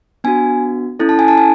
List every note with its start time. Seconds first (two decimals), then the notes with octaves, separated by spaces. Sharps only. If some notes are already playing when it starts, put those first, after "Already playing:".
0.24 B3 D4 F#4 G#5
0.99 C#4 E4 A4
1.09 A5
1.19 G#5
1.28 A5
1.38 G#5